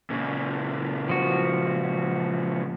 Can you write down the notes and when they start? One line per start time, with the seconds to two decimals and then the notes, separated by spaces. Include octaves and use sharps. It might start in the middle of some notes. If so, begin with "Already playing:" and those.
0.10 A#2 C#3
1.09 F3 F#4